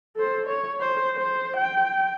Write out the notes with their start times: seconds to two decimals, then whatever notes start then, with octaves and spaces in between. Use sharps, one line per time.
0.16 A4 C5
0.46 C#5
0.81 C5
1.17 C5
1.57 G5